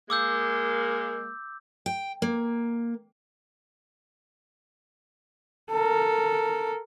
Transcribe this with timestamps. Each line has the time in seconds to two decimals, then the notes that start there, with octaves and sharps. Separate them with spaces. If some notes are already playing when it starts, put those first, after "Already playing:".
0.10 G#3 A#3 D6 E6 G6
1.86 G5
2.22 A#3
5.71 A4 A#4